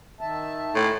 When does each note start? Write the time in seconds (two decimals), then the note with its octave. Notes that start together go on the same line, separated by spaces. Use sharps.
0.21 D#3 E5 A5
0.75 A2